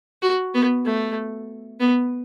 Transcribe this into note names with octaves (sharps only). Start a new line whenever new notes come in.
F#4
B3
A3
B3